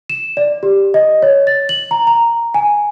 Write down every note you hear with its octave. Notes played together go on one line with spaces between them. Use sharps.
E7
D5
G4
D#5
C#5
A6
F#7
A#5
A#5
G#5